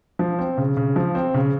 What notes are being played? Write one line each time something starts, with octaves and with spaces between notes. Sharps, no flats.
F3
C4
C#3
C#3
F3
C4
C#3